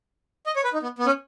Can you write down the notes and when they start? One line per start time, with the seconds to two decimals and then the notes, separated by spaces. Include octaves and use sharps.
0.46 D#5
0.56 C#5
0.64 B4
0.73 D#4
0.83 B3
0.99 B3
1.06 C#4